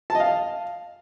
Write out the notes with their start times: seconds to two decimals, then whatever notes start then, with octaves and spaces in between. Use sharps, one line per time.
0.10 A5
0.15 D#5
0.20 F5